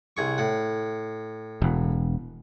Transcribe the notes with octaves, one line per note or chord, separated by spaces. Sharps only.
C2 G#4 C#6
A2 F#5
E1